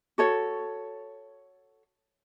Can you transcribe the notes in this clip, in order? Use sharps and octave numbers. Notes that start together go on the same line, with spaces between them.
F#4 A4 C#5